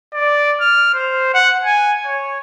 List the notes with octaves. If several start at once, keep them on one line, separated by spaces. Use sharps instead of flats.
D5
F6
C5
F#5
G#5
C#5